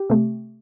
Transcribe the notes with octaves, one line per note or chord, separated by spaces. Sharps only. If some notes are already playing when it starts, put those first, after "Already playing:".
Already playing: G4
C3 A3